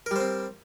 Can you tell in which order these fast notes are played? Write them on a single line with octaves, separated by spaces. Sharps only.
A#4 G3 C5 C4